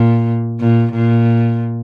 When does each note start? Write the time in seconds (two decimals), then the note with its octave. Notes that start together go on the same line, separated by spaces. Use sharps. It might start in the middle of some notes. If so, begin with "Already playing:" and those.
Already playing: A#2
0.60 A#2
0.93 A#2